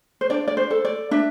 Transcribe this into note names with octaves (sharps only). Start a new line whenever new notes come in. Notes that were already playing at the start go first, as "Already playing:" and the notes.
C5
D4 D5
D5
C5
A4
D5
D4 E5